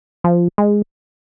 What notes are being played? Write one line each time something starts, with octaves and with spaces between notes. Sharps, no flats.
F3
G#3